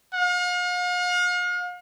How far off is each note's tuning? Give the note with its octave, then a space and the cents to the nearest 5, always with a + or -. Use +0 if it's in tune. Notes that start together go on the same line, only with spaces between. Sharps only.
F5 +45